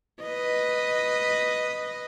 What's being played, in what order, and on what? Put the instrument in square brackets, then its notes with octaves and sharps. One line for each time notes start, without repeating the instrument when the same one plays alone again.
[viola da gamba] B4 D#5